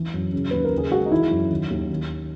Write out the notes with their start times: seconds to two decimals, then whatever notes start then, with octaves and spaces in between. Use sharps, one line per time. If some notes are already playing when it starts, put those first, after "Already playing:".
Already playing: E3
0.14 F#2
0.33 C#3
0.51 D#2 B4
0.64 A#4
0.72 C#3
0.78 G#4
0.91 G#3 F#4
1.06 D#4
1.12 E3 E4
1.31 F#2
1.51 D#3
1.70 D#2
1.90 D#3